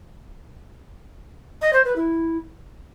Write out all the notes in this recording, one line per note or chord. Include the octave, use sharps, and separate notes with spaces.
D#5
C5
B4
E4